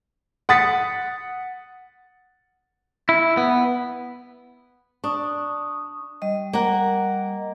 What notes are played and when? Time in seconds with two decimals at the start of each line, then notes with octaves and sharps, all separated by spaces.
0.49 F#5 D#6 A6 B6 C#7
3.09 E4
3.37 B3
5.04 D4 C#6 D#6
6.22 G3 D#5
6.53 A#3 F#5